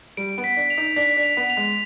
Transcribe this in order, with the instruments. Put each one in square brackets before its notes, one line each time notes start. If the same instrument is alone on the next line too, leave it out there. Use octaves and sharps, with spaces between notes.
[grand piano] G3 [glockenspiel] D7
[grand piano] B3
[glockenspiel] B6
[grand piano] D4
[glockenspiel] F7
[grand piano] D#4
[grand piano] D4 [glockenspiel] B6
[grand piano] D4
[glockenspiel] F7
[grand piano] B3
[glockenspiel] F7
[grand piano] G#3